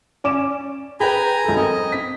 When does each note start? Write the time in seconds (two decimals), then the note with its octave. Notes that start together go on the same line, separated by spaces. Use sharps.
0.24 C#4 D5 D6 E7
1.00 G#4 B4 G5 G#5 A#5 B5 G6
1.44 B1 A4
1.57 C4 A4 A#4 D#5
1.92 B6